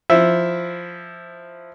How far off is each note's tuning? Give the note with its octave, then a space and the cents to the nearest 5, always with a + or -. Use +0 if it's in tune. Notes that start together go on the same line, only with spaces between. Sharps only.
F3 +0 E4 +0 E5 +0